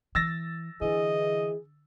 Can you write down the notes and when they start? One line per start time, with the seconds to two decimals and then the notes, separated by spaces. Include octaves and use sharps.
0.15 E3 E6 A6 A#6
0.81 D3 E3 G#4 D#5